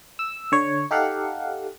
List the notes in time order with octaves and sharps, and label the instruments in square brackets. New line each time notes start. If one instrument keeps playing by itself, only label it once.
[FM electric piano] E6
D3 C#5
D#4 G4 A4 F5 F#5